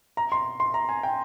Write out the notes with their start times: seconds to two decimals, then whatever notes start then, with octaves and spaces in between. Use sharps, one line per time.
0.17 A#5
0.32 C6
0.60 C6
0.74 A#5
0.89 G#5
1.03 G5